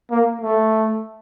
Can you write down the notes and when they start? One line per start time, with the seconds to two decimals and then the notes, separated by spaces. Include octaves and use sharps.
0.11 A#3
0.41 A3